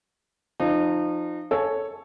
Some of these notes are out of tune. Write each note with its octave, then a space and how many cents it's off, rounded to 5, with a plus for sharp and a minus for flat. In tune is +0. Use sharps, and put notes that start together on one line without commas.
F3 +0 D#4 -30
A4 +0 C#5 +0 G#5 +10